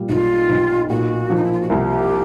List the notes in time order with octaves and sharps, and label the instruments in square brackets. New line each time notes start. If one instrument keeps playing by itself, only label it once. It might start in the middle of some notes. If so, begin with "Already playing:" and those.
Already playing: [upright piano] A#2 G3
[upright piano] B1 [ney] F4 F#4
[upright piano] B1
[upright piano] A#2 [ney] F#4
[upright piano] F3
[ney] D#4
E4
F4
F#4
[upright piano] C2 [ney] G4